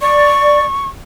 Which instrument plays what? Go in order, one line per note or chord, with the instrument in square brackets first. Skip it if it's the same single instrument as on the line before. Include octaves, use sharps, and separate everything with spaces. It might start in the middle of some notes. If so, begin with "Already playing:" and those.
[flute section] D5 [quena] C#6